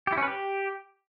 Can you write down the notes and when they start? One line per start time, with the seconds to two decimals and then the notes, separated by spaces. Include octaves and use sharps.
0.07 G4
0.12 E4
0.17 C#4
0.23 B4
0.28 G4